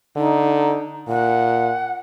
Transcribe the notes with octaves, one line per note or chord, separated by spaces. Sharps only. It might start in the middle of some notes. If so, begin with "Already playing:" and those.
D3 D#4
A#2 F#5